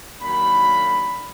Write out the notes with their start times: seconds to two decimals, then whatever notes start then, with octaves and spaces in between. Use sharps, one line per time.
0.21 D#3 F#3 A#3 D4 B5